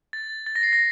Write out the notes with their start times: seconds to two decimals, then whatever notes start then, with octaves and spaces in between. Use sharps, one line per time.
0.13 A6
0.47 A6
0.56 A#6
0.63 C7
0.73 A#6